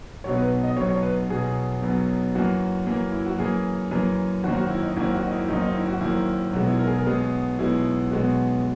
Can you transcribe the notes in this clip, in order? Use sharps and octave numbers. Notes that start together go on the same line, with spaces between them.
B1 B2 F#3 B3 C#5
B4
D#5
B1 B2 F#3 B3 C#5
C#5
B4
B1 B2 F#3 B3 G#4
B1 B2 F#3 B3
F#2 E3 A#3 F#4
F#2 E3 A#3
E4
F#4
F#2 E3 A#3 G#4
F#2 E3 A#3
G#1 F#2 D#3 A#3 F#4
F#4
E4
D#4
G#1 F#2 D#3 A#3 E4
F#4
D#4
E4
G#1 F#2 D#3 A#3 D#4
D#4
E4
F#4
G#1 F#2 D#3 A#3 E4
B1 B2 G#3 B3 F#4
E4
A#4
G#4
A#4
B1 B2 G#3 B3 G#4
B1 B2 G#3 B3 E4
B1 B2 G#3 B3 F#4